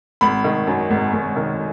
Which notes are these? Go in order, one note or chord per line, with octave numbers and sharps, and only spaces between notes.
G#1 B5
D#3
F#2
G#1
G#1
D#3